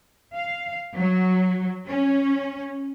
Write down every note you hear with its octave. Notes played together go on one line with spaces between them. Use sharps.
F5
F#3
C#4